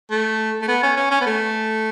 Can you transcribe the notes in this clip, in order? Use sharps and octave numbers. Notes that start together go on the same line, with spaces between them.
A3
A3
B3
C#4
C#4
C#4
B3
A3